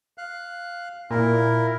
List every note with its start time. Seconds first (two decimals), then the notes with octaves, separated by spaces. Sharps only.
0.18 F5 F#6
1.11 A#2 E4 A#4